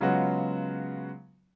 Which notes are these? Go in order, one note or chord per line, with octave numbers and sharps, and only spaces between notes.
C#3 F#3 G#3 B3 F4 F#4